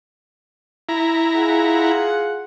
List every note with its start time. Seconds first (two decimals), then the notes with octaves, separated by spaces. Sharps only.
0.89 E4 A#5
1.35 F4 G#4 F#5